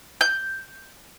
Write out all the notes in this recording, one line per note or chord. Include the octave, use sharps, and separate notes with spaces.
G6